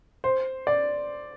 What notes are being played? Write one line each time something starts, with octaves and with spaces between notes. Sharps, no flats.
C5
D5